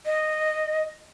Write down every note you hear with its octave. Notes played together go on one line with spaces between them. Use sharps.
D#5